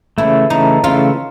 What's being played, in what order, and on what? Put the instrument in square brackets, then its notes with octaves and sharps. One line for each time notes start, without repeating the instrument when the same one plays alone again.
[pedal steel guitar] C#3 E3 A3 [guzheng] E4
[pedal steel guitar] C#3 E3 A3 [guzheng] D#4
[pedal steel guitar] C#3 E3 A3 [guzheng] F4